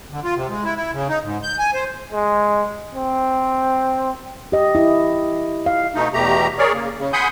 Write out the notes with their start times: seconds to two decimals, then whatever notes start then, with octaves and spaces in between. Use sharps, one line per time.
0.11 D3
0.24 F4
0.36 C3
0.49 G#3
0.64 E4
0.76 E4
0.93 C#3
1.09 D#4
1.23 G#2
1.43 G6
1.59 G#5
1.74 C5
2.12 G#3
2.94 C4
4.52 G4 D#5
4.75 E4
5.66 F5
5.94 B2 A3 D#4
6.14 E2 B2 A3 G4 A#5
6.58 G#4 A#4 C#5 D5
6.74 C#3 A#3
6.98 C#3
7.13 F#5 G#5 B5 C6 D#6 G6